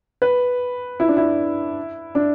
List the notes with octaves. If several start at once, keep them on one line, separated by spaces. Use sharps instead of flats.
B4
E4
D4
E4
D4